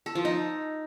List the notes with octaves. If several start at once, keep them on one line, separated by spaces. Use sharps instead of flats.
A4
F3
D#4